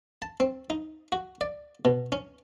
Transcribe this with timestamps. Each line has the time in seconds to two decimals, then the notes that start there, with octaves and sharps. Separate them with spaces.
0.22 A5
0.40 C4
0.70 D#4
1.12 F#4
1.41 D5
1.85 B2
2.12 C#4